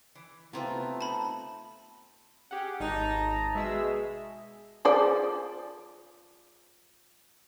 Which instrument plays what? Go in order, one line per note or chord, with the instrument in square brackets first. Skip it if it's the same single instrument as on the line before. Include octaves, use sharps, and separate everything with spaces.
[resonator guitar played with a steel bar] E3
[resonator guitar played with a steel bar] C3 A#5 [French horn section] A3 [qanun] B3 C4 F4
[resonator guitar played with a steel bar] D#4 [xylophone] A5 B5
[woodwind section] C#4 G#4 [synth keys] G4 F#5
[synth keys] G#1 [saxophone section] D#4 [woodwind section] A5 A#5
[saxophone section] B2 [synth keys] G#3 G#4 E6 [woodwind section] E5
[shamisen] F3 G#4 D5